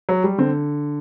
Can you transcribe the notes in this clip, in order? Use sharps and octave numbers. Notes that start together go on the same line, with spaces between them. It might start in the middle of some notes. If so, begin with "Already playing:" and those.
F#3
G3
D3 C4